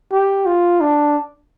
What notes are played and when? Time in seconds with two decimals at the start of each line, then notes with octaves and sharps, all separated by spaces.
0.12 G4
0.46 F4
0.81 D4